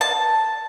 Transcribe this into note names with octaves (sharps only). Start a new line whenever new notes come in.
A5